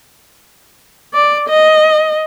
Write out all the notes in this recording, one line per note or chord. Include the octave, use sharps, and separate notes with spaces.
D5
D#5